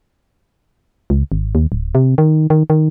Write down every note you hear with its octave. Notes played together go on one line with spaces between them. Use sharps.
C#2
G#1
D#2
D1
C3
D#3
D#3
D#3